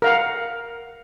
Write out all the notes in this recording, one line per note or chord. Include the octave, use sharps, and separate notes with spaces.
A#4 F5 F#5